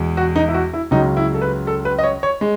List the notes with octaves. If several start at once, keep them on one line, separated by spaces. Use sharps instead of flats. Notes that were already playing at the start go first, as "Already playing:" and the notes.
Already playing: E2 B2 G#3
F#4
D#4
E4
F#4
E4
C#2 C#3 F#3 D#4
E4
A4
B4
A4
B4
D#5
C#5
C#5
G#3